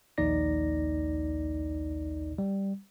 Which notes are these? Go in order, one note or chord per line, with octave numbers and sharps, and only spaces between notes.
A#1 D#2 D#4 D5 A#6
G3